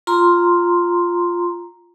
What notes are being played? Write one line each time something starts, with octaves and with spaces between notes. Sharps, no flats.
F4 A#5 C6